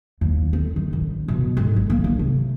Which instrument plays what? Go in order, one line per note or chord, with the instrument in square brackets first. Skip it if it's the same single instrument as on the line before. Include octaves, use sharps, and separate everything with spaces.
[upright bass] D#2
C4
D#3
A1
B2
G#2
G#1
A#3
D2
C3